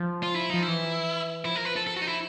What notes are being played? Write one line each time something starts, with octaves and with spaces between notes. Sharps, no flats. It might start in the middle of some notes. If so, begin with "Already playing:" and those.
Already playing: F3
F4
E4
F3 D#4
E4
E3
F3 E4
A#4
B4
A4
A4
F#4
D#4
E4